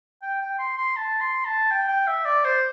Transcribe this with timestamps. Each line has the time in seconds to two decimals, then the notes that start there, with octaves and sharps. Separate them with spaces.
0.23 G5
0.41 G5
0.59 C6
0.78 C6
0.96 A5
1.21 C6
1.45 A5
1.71 G5
1.88 G5
2.07 E5
2.25 D5
2.44 C5